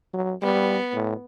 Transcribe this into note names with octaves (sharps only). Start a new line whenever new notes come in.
F#3
G3 B3
A2